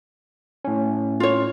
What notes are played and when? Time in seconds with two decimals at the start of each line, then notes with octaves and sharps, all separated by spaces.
0.65 A2 C#4
1.20 F4 C#5